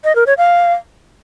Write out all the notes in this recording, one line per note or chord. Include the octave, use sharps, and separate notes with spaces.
D#5
A#4
C#5
F5